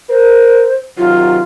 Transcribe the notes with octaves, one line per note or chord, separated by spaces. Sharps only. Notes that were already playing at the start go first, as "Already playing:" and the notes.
A#4 C5
C3 D#3 F#3 F4